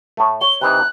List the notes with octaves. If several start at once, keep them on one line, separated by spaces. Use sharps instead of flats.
A2 A3
C#5 G7
C3 E3 D#4 F#6